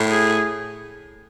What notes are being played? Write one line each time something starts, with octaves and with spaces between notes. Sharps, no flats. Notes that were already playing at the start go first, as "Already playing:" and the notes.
Already playing: A2
G#4